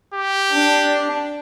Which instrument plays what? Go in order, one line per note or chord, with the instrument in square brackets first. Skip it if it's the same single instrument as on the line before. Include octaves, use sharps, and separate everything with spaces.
[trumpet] G4
[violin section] D4